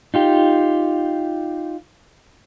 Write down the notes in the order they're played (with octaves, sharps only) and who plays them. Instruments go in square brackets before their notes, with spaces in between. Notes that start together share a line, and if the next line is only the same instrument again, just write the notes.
[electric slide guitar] D#4 F4 G4